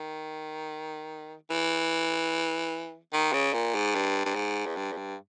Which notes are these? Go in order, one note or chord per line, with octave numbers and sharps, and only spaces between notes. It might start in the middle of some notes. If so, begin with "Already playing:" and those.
Already playing: D#3
E3
D#3
C#3
A#2
G#2
G2
G2
G#2
E2
G2
E2
G2